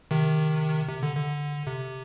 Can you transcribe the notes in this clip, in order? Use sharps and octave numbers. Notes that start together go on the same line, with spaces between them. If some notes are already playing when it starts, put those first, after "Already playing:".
C3 D#3
C3
D3
D3
C3